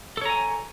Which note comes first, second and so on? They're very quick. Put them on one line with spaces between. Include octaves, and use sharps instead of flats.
A4 C#5 A#5 G#5